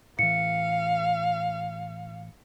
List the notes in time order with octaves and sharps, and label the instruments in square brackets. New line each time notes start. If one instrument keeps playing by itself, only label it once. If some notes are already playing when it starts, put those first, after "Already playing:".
[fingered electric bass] A2 E3 [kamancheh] F5 [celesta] C#7